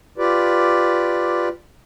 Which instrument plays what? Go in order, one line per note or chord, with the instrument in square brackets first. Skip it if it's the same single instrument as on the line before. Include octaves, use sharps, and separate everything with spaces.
[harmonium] F4 G4 B4 D5